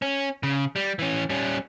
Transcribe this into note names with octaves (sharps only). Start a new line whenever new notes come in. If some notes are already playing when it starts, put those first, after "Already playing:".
C#4
C#3
G3
E3 C#4
G3 C#4